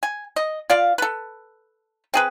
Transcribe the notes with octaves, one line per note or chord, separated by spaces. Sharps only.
G#5
D#5
F4 D5 F5
A4 B4
C4 G#4 B4